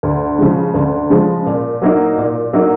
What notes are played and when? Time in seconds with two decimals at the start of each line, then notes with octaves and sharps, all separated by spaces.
0.03 D2
0.38 C#3 F3 G#3
0.74 D2
1.10 C#3 F3 G#3
1.46 A#2
1.82 F#3 A#3 D#4
2.18 A#2
2.53 F#3 A#3 D#4